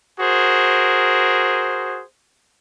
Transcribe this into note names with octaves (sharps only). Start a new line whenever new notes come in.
F#4 G#4 A#4 C5